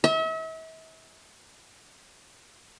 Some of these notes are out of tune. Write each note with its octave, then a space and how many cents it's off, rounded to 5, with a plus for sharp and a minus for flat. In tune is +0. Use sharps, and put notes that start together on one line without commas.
E5 -40